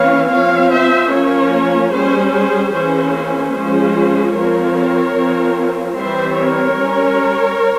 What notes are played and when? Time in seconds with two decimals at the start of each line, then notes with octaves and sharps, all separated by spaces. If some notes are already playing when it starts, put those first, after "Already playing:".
Already playing: E3 A#3 C#4 C#5 F5
0.29 F3 C4 C#5 F5
0.70 C5 E5
1.10 F3 A#3 C#4 A#4 C#5
1.91 G3 C#4 G#4 C5
2.32 G#4 C5
2.72 E3 A#3 C#4 G#4 C5
3.53 F3 G#3 C#4 G#4 C5
4.34 F3 C4 A#4 C#5
5.15 F3 C4
5.96 E3 G3 C4 C5 E5
6.36 A#4 C#5
6.77 G3 C#4